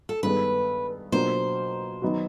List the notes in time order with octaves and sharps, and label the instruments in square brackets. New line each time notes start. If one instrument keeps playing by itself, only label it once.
[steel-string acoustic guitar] A4
[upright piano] G2 D#3 G#3 B3 [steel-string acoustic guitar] B4
[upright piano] B2 F#3 A#3 D4 F4 [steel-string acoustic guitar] C5
[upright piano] D#3 F#3 B3 D#4 F#4